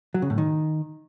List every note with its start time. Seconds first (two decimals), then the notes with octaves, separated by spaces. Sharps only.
0.14 F#3
0.22 C#3
0.30 A2
0.38 D#3